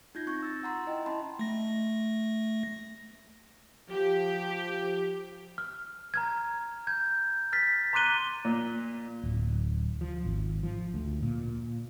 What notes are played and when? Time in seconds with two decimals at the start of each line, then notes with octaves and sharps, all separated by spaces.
0.15 D#4 F4 G6 G#6 A#6
0.27 C4 C#6 A#6
0.43 E6 A6
0.63 F#5 A#5 C6
0.86 E4 D#5 G5
1.06 C#4 A5 B5 C6
1.39 A3 A#6
3.90 F3 G4
5.58 F6
6.14 A#5 F6 G#6
6.87 G6 G#6
7.53 F6 A6 B6
7.93 A#5 C6 D6 F#6 D#7 G7
8.45 A#2
9.23 D1
10.01 F3
10.25 G#1
10.63 F3
10.94 D2
11.23 A#2